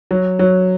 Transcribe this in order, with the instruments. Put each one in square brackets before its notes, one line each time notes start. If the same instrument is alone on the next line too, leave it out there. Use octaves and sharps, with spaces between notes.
[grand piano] F#3
F#3